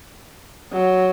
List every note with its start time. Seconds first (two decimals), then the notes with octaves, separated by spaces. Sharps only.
0.72 F#3